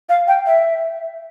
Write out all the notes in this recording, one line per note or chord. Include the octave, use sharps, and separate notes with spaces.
F5
G5
E5